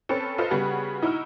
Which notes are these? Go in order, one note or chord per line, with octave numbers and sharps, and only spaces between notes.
C4 C#4 A4 B4
F4 A4 B4 C5 D#5 F5
C#3 G3 B3 F#4 G#4 B4
D#4 E4 F#4 E6 F6